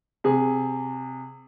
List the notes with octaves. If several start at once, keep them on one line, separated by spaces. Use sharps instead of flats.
C3 G#4